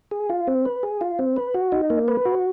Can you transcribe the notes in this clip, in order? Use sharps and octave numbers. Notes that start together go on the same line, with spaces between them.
G#4
F4
C4
B4
G#4
F4
C4
B4
F#4
D#4
A#3
B4
F#4